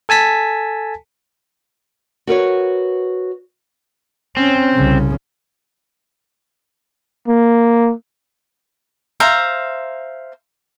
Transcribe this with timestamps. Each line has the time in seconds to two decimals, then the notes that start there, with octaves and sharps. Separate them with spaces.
0.09 A4 G#5 A5 B6
2.27 F#4 A#4 B4 C#5
4.37 C4 C#4
4.74 C2 C#3
7.28 A#3
9.20 C5 E5 F5 A#5